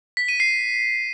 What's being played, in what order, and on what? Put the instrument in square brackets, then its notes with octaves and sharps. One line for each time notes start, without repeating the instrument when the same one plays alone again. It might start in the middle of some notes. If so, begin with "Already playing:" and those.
[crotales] B6
D#7
C7